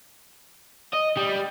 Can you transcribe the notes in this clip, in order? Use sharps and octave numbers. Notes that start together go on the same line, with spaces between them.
D#5
G3